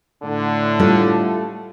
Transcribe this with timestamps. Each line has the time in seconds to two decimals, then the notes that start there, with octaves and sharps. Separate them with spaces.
0.23 A2 D3
0.79 G3 A3 F4